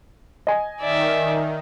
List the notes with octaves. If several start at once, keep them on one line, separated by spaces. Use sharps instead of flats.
D#5 G#5
D#3 D5 E5